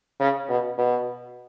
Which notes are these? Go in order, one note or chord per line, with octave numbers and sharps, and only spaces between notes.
C#3
B2
B2